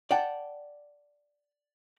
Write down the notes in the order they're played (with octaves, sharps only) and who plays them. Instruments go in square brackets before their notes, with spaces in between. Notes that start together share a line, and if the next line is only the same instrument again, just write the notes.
[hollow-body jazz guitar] D5 F#5 G5 A5